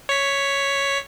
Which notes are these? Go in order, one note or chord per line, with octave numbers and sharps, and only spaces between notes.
C#5 B6